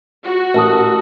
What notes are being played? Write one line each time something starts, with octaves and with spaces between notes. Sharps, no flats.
F#4
A1 A#4 A5 D#6